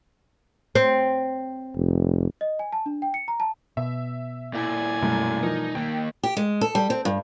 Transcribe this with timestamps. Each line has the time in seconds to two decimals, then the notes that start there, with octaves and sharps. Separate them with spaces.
0.75 C4
1.77 F1
2.41 D#5
2.59 G#5
2.73 A5
2.86 D4
3.02 G5
3.14 C#7
3.28 A#5
3.40 A5
3.77 B2 E5
4.53 A#2 E4 D5 G#5
5.02 F#2 B2 G3 A3
5.43 E3 F3 D#4 A#4
5.75 D#3 A#3 G5
6.23 G4
6.37 G#3
6.61 A4
6.75 G3
6.90 C4
7.05 G2